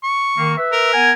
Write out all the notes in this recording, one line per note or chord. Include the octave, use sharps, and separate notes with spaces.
C#6
D#3 A#3
B4 E5
A#4
B3 F#5 G#5